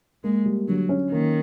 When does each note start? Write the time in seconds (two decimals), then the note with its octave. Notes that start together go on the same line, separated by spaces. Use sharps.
0.24 G#3 A#3
0.46 G3
0.67 D3 F#3
0.89 C#4
1.11 D#3 A#3